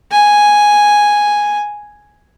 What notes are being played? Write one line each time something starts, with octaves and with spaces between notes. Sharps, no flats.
G#5